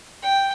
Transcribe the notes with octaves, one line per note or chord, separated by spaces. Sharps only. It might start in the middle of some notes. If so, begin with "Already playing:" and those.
G5